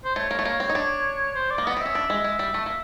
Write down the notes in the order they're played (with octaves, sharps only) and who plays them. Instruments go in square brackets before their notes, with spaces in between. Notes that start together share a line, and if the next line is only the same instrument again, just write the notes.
[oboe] C5
[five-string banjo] A3 [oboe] C#5
[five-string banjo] A#3
A3
A#3
C4
D#4
D4
[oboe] C5
D5
[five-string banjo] A#3
[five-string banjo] B3 [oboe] D#5
[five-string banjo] C4
[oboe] E5
[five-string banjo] C#4
D4
G#3
G#3
G3
A3
A#3